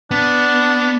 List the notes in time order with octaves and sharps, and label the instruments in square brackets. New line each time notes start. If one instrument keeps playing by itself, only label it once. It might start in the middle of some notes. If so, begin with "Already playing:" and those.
[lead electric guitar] B3 [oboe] D4